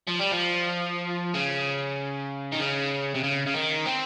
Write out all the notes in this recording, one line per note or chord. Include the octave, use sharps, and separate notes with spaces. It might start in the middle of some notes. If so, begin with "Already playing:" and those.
F3
G3
F3
C#3
D#3
C#3
C3
C#3
C#3
D#3
C4